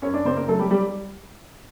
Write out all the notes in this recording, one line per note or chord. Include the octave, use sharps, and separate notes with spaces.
F#2 C#4 C#5
D4 D5
C#3 C4 C5
A#3 A#4
F#3 A3 A4
G3 G4
G3 G4